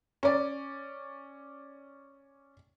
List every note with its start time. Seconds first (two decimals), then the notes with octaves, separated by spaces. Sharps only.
0.23 C#4 D5